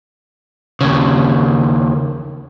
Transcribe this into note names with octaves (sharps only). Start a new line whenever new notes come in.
D#2 C#3